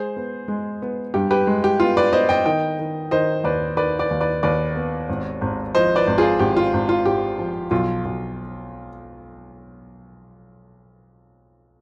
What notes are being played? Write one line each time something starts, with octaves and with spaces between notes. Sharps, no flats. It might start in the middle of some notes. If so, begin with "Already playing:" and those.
Already playing: G#3 G#4 C5
B3
G#3
B3
G2 G4
G4 B4
G#3
G4
B3 F4
B4 D5
B3 C5 D#5
D#5 G5
D#3 D#5 G5
D#3
D#3 C5 D#5
D#2 B4 D5
D#3 B4 D5
B4 D5
D#2
B4 D5
D#2 B4 D5
B3
G#1
G#1
F3 C5 D#5
B4 D5
G#1
F4 G#4
G#1 G4
F4
G#1
F4
G#1 G4
F3
B1 F4
B1